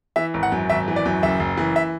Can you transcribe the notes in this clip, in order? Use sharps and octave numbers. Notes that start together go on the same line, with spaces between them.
E3 E5
G#1
F#5
F#2
G#1 E5
E3
D5
F#2
F#1 E5
F#1
E3
E5